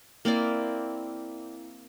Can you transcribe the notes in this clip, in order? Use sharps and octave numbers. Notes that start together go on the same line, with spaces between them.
A#3 C4 E4 D5